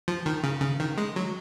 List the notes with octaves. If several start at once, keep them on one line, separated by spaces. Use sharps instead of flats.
F3
D#3
C#3
C#3
D#3
G#3
F#3